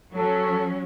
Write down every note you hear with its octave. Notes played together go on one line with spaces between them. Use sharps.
F#3 C#4 A4